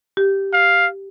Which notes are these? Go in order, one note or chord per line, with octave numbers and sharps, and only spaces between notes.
G4
F5